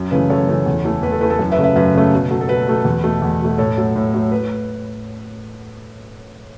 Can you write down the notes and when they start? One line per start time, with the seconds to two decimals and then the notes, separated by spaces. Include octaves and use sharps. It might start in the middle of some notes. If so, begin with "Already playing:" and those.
Already playing: F#2
0.11 C#3 E3 A3 B4
0.30 F#2 A4 C#5
0.48 C#3 E3 A3
0.66 E2
0.84 E3 A3
1.03 E2 B4
1.12 A4
1.21 E3 A3 B4
1.30 A4
1.39 F#2
1.52 B4 E5
1.58 C#3 A3
1.63 B4 E5
1.76 F#2 B4
1.94 C#3 A3
2.13 B2
2.30 F#3 A3
2.41 A4
2.49 B2 B4
2.67 F#3 A3
2.85 E2
3.04 B2 A3
3.22 E2
3.40 B2 A3
3.58 A2 A4 C#5
3.77 F#3 A3
3.95 A2
4.14 F#3 A3
4.31 B4